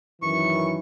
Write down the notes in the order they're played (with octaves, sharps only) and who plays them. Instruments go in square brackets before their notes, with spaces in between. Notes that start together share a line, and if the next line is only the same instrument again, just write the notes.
[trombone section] F#2 D#3 E3 [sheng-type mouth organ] C#6